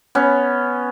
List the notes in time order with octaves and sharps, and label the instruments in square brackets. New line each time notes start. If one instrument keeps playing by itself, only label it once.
[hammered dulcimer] B3 C#4